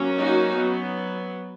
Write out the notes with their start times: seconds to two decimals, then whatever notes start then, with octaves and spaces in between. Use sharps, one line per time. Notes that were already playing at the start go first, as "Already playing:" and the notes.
Already playing: F#3 A#3 C#4
0.17 D#4 F#4
0.55 F#3 B3